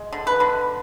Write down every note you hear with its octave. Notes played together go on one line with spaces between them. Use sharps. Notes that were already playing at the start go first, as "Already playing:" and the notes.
Already playing: G#3
D3
B4
D3